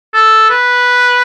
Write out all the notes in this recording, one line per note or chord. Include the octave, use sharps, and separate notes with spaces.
A4
B4